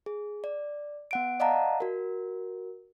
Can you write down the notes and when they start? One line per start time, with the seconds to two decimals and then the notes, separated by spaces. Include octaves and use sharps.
0.06 G#4
0.44 D5
1.11 B3 F#5 D7
1.40 D5 D#5 F5 F#5 A5 A#5
1.80 F#4 A#4